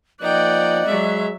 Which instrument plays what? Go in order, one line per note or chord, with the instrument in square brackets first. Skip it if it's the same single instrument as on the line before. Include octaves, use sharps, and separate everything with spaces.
[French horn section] F3 A#3 [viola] D#4 G5 [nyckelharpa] D5 F#5 [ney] D#5
[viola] F#3 E5 [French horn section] G#3